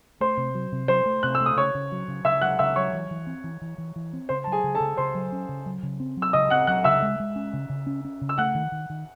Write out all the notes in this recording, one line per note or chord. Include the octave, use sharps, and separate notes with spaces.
A3 C5 C6
C3
F#3
C3
F#3 C5 C6
A3
C3 F#6
E6
A3
D#6
C#3 C#5 C#6
C#3
F#3
C#3
C#3 E5 E6
F#3 F#5 F#6
C#3 E5 E6
F#3 C#5 C#6
E3
E3
C4
E3
E3
E3
E3
C4
C#3 C5 C6
A5
F#3
G#4 G#5
C#3
A4 A5
C#3
C#3 C5 C6
F#3
C#4
C#3
F#3
C#3
C4
F#3
E6
C#3 D#5 D#6
C4 F#5 F#6
F#3 F#5 F#6
C#3 E5 E6
G#3
G#3
C#4
C#3
C#3
C#4
C#4
C#3
E6
A3 F#5 F#6
D#3
D#3
D#3